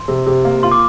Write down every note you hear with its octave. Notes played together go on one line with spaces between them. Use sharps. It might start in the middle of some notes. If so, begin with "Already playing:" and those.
Already playing: C6
C3
C3
A#3
F4 C6
D6